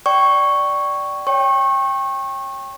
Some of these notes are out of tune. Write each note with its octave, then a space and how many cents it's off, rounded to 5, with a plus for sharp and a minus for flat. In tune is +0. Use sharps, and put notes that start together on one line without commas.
D5 +0 G5 -25 C#6 +0
C#5 +0 G5 +15 C#6 -30